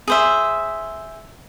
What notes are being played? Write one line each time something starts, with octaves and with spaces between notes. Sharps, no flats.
G#4 C5 E5